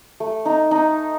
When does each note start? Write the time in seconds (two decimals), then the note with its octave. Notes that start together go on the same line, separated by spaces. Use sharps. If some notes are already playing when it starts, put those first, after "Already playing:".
0.20 A3
0.46 D#4
0.71 D#4